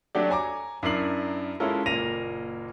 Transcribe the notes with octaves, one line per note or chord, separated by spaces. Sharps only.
F#3 A3 D4 F#4 G4 D5
C#5 G#5 A#5 D6
F#2 D4 E4 A#4 C7 F#7
G#3 C#4 E4 F4 A4 A#4
F#1 A#2 A#3 A#6 D#7 F7